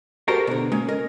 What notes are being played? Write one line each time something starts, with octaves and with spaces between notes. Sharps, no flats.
F#4 G4 A4 A#4 C5 D5
B2 D3
G#3 A#3 C#4
A#4 D#5